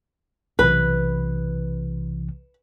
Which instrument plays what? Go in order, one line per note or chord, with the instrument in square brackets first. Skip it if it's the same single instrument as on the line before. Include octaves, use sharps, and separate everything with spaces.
[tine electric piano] B1 C3 E3 [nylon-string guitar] B4